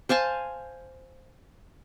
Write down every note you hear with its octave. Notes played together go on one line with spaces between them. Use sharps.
C5 F5 G#5 A5